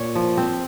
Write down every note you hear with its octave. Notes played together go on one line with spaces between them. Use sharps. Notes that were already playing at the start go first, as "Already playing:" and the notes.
Already playing: A#2 C#5
F3
C4